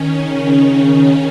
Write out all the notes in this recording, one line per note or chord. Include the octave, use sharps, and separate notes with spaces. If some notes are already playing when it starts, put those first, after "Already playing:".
Already playing: D#3 C#4
C#3